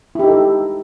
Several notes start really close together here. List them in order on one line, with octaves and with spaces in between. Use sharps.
E4 G4 D#4 A4